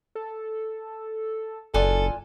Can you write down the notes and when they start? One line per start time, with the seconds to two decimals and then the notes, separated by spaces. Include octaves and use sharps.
0.15 A4
1.74 F#1 D4 F4 A4 G#5